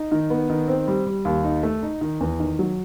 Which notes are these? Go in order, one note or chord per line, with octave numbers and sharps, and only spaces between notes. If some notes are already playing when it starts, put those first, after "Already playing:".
Already playing: D#4
D#3
B3
D#3
C4
G3
G3
D#2
D#4
A3
D#4
D#3
E2
D#3
F#3